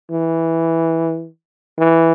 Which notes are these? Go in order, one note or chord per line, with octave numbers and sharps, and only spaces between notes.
E3
E3